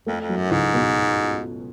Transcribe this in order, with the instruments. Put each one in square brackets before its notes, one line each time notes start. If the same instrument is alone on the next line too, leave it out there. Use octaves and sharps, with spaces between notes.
[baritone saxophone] F2 [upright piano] A3
[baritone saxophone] F2
[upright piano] F#3
[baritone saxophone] F#2
[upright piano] C#2 [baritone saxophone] G#2
[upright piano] B2